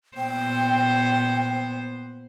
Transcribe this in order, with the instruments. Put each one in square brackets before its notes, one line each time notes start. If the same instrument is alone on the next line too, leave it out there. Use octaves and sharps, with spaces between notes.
[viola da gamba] A#2 B3 C5 [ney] G5